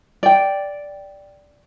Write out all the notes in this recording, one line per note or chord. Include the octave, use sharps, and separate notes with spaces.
D5 G5